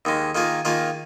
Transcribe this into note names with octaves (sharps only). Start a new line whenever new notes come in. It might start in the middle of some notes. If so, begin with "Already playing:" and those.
D#2 D#3 G#3
D#3 A#3 F4 G#4
D#3 A#3 F4 G#4